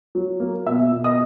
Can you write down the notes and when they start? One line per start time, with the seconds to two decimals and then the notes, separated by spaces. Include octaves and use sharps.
0.15 F#3
0.40 A#3
0.66 B2 E5 E6
0.92 B2
1.04 D#5 D#6